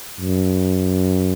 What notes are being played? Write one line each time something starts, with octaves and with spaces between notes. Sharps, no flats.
F#2